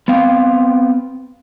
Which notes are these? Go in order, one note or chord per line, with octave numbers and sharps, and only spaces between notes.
B3 C4 F5 G5